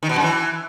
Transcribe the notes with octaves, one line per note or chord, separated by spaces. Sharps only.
D#3
B2
F#2
E3